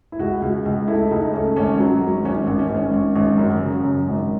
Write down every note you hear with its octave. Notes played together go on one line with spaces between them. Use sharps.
E4
C#2 F#4
C#2
C#2
A3 E4
C#2 D#4
A3 C#4
G#1 C#4
F#3
G#1
G#1 C#4
G#1
C#4
G#1
C#4
G#1
G#1
F#2
C#3
F#2
G#1